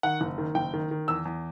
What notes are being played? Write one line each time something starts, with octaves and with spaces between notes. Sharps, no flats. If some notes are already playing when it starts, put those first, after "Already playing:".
D#3 F#5
F#1
D#3
F#1 G5
D#3
D#3
E2 E6
E2